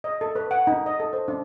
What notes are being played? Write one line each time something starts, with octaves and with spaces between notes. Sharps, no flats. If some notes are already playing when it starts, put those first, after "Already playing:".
D#5
A4
B4
F#5
D#4
D#5
A4
C5
D4